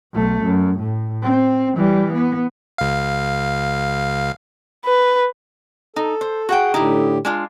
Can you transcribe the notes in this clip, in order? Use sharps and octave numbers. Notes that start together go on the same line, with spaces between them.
B1 A3
F#2
A2
C4
E3 G3
B3
C#2 F5
B4
D#4 A4
C5
F#4 G#4 F#5 G5
A2 D3 D#4 E4 G4
G#3 D4 F4